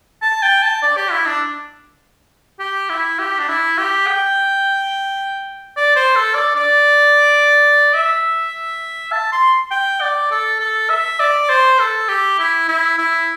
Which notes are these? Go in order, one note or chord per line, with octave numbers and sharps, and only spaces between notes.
A5
G5
A5
D5
G4
E4
D4
G4
E4
G4
D4
E4
G4
G5
D5
C5
A4
D5
D5
E5
A5
C6
G5
D5
A4
A4
E5
D5
C5
A4
G4
E4
E4
E4